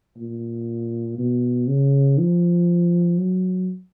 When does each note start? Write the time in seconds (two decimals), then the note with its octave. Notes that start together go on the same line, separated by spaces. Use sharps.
0.17 A#2
1.18 B2
1.68 C#3
2.18 F3
3.18 F#3